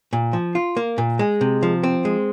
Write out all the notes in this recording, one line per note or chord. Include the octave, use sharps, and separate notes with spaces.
A#2
F3
F4
A#3
A#2
G#3
C3
F3
C4
G#3